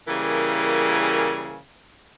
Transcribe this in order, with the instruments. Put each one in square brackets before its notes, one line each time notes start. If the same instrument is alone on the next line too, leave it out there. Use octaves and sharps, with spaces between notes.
[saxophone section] C#3 E3 G3 A#3 G#4 A#4